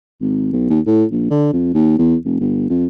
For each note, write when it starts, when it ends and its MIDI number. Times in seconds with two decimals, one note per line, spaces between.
0.21 0.48 32
0.53 0.69 35
0.70 0.80 39
0.86 1.04 45
1.12 1.26 34
1.31 1.50 50
1.53 1.72 41
1.74 1.97 39
1.98 2.15 40
2.25 2.40 29
2.40 2.66 31
2.70 2.86 41